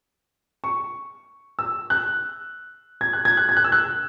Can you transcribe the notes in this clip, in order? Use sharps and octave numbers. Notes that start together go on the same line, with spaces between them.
C#6
E6
F#6
G#6
F#6
G#6
F#6
G#6
F#6
E6
F#6